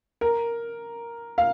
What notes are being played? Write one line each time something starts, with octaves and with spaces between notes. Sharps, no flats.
A#4
F5